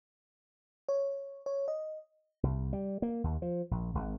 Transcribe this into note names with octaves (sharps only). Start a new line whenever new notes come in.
C#5
C#5
D#5
C2
G3
A#3
D#2
F3
A#1
G#1